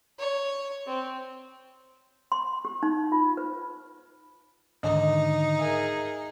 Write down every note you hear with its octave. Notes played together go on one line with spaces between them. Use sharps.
C#5
C4
C6
G4
D#4
F4
B4
G#2 D3 D#3 D#4 D#5
G#4 A#4 E5